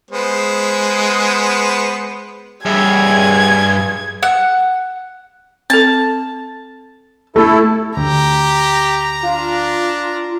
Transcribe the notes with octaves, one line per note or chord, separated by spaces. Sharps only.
G#3 B3 C5
G2 G#4 E5 G#6
F#5
C4 A4 A5
A3 E4 A4
D2 G4 A#5
D4 F4